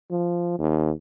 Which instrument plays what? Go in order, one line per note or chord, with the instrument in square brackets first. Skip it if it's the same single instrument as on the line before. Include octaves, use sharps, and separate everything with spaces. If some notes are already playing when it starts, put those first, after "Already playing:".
[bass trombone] F3
D#2